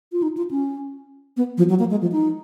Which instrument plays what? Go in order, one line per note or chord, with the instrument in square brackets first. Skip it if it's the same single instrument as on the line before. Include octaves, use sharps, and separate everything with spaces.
[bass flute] F4
D#4
F4
C#4
B3
F3
F#3
A#3
G#3
F3
D#4